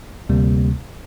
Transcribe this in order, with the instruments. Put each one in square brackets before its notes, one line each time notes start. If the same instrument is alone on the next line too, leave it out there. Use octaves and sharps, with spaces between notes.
[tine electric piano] D2 C3 G3 A#3